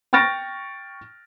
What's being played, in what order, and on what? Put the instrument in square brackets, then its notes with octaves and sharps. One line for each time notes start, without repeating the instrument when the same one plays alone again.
[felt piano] G5 C#6 F6 A6 A#6 D7